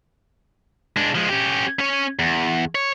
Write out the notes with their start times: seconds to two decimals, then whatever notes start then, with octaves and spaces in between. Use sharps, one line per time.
0.97 G#3 D4
1.15 F3 G#3
1.29 C#4 G4
1.79 C#4 C#5
2.19 E2
2.75 C#5